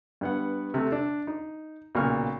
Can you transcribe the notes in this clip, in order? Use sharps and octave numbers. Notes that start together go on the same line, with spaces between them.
G2 B3 F#5
C3 A3
D4
D#4
B1 A#2 C#3 C#6 F6